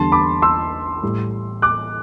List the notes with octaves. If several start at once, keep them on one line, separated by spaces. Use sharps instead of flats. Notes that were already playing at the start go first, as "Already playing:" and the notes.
Already playing: E2 D3 G3 A5 C6
B5 D6
C6 E6
A2 G3
D6 F#6